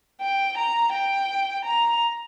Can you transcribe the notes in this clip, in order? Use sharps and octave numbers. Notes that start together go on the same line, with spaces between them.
G5
A#5
G5
A#5